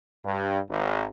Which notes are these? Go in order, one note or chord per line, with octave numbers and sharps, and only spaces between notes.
G2
G#1